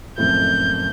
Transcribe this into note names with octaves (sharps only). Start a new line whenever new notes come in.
F#1 F2 A2 G6